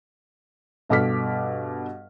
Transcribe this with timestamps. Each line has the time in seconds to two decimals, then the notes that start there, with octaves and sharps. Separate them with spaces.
0.89 G2 B2 A4 D6 F6 B6